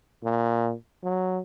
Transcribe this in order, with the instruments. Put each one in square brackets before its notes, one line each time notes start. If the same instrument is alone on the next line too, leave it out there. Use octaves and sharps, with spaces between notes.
[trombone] A#2
F#3